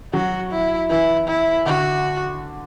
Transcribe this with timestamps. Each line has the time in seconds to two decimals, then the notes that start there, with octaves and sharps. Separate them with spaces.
0.13 F#3 F#4
0.52 E4
0.90 E3 E4
1.28 E4
1.66 D3 F#4